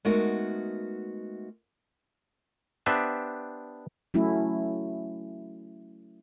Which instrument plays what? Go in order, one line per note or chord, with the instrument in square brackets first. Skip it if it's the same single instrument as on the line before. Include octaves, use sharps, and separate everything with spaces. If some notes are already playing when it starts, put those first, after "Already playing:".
[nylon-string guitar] G#3 A3 B3 D#4 F#4 A#4
[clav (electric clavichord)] B3 D4 G4 B4 C5 E5
[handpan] F#3 A3 C#4 E4